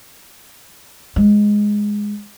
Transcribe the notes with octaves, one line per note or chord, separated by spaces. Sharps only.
G#3